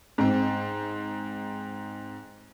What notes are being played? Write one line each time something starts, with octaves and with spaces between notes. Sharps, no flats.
G#2 C4